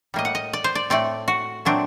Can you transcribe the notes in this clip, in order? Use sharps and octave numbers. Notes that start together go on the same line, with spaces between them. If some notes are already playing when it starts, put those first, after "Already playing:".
A2 G3 A#3 D#5
F#5
D#5
D5
C5
D5
A2 A3 C4 D5
F#4
A#2 F#3 A3 C4 D4